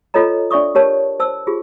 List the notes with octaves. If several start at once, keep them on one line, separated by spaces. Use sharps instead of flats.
F4 A4 C#5 D#5 A#5
D4 D5 E5 C#6 D#6
G4 A#4 C#5 A5
C5 A5 E6
F4 G4 G#4